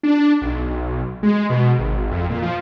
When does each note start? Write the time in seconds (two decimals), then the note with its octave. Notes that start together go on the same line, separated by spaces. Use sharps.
0.03 D4
0.42 B1
1.23 G#3
1.50 B2
1.78 G#1
2.11 F2
2.30 A#2
2.42 F3